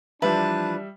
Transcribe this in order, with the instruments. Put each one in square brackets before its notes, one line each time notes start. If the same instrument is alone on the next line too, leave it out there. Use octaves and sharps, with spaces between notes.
[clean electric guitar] E3 F3 [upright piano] G3 E5 [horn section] D4 A5 [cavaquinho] B4